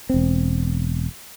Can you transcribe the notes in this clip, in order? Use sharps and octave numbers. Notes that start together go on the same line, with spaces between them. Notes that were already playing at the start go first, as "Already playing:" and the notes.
E1 C4